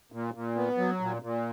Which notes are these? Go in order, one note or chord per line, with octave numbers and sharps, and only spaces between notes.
A#2
A#2
B3
F#3
A#2
A#2